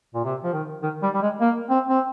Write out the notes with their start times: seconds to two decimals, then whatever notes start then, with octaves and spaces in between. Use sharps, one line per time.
0.15 A#2
0.25 C3
0.44 F3
0.53 D#3
0.83 D#3
1.03 G3
1.14 G3
1.22 G#3
1.41 A#3
1.70 C4
1.89 C4